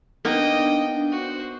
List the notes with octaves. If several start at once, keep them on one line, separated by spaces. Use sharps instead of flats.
A#3 B3 D4 D#4 D#5 G5
F#4 C5